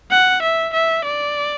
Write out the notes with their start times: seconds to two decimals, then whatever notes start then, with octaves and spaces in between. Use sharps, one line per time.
0.11 F#5
0.42 E5
0.74 E5
1.05 D5